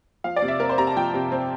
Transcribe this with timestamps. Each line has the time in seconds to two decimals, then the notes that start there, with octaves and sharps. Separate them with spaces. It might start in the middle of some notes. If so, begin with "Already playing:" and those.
0.24 F3 F5
0.36 D5
0.42 C3
0.48 E5
0.60 C4 A#4
0.69 C5
0.78 C3 A#5
0.87 A5
0.96 F3 G5
1.14 C3
1.32 C4